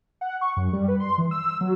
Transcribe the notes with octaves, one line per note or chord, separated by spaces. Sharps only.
F#5
C#6
F#2
G3
B4
C6
E3
E6
F#3